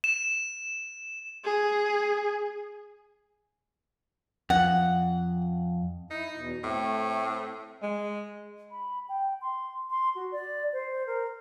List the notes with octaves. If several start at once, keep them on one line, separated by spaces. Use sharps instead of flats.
E7
G#4
F2 F#5
D#4 E4
E2 B2
A2 A3 C4
G#3
B5
G5
C6
C6
F#4
D5
C5
A#4